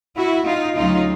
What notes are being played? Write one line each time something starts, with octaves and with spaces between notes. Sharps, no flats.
E4 F#4
D#4 F4
D2 C#3 F#3 D#4 F4